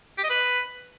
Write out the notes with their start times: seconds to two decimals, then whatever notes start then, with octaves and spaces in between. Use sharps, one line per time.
0.18 G4
0.24 D#5
0.30 B4